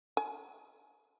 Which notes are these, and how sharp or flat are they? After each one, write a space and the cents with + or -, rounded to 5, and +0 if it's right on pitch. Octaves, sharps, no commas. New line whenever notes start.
G#5 +25